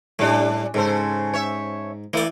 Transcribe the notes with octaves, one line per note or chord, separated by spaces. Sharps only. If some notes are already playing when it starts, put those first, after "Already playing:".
A2 G3 D4
G#2 C#3 A4 C5
C#5 E5
E3 A3 D5